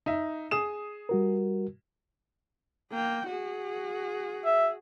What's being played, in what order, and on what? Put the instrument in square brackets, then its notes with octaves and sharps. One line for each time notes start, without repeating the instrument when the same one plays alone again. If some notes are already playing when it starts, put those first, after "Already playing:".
[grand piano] D#4 E5
G#4 D#6 E7
[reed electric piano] G3 F#4 A#4
[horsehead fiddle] A#3 G5
F#4 G#4
[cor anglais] E5